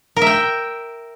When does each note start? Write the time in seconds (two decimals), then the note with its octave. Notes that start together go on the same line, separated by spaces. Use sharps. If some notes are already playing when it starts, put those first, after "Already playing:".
0.16 A#4
0.22 E5
0.27 G5